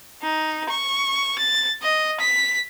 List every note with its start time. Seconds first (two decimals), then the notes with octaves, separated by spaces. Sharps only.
0.22 D#4
0.69 C#6
1.39 A6
1.82 D#5
2.20 B6